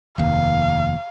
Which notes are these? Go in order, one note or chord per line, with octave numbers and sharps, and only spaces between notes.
F1 D#2 F5